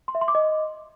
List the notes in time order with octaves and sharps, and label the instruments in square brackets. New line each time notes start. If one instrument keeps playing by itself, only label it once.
[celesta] C6
E5
C6
D6
D#5